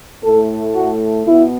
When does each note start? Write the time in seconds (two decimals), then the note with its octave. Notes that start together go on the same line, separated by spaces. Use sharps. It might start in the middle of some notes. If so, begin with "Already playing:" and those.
0.23 A2 A3 A4
0.75 F#4
1.27 B2 B3 E4